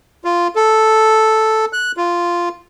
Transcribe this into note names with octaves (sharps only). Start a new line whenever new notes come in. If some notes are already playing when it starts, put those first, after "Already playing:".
F4
A4
F#6
F4